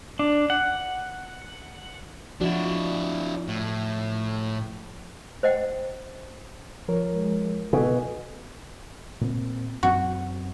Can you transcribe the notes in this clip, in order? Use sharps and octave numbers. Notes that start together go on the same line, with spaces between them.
D4
F#5
F3 D4 E4 F#4
A2
C5 D#5 F#5 G5
F3 A#4 C#5
G#3
B2 A4 G#5
A#2 C4
F#2 C4 F#4